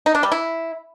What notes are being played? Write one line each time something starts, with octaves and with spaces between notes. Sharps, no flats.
D#4
D4
G3
E4